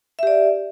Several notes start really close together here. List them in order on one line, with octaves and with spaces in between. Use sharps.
E5 G4 D5